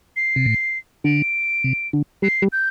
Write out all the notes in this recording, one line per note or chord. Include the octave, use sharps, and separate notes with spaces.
C7
C3
A2
D3 D7
C3
D3
G3 C7
G3
G6